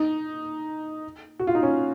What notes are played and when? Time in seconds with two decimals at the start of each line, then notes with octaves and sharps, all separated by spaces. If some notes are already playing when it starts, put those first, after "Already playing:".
Already playing: D#4
1.39 F#4
1.47 F4
1.55 D#4
1.63 C#4